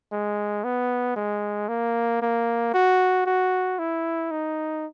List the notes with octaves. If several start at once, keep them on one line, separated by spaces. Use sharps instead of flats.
G#3
B3
G#3
A#3
A#3
F#4
F#4
E4
D#4